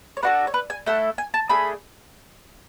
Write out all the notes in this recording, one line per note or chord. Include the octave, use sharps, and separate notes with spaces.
C#5
D4 F#4 A4 B4
C#5
B4
G#5
A3 E4 A4 F#5
G#5
A5
A3 D4 G#4 B5